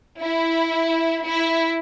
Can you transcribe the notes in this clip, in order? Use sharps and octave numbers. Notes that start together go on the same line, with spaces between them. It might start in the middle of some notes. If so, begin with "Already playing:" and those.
E4
E4